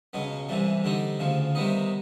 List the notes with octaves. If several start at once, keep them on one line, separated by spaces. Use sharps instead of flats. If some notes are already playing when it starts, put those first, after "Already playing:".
C#2 B2 F#3 B3
C2 C3 E3 G3
D3 G3 C4 D#4
D2 C#3 F3
C3 D#3 G3 B3 D#4